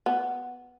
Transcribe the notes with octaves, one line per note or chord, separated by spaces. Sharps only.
B3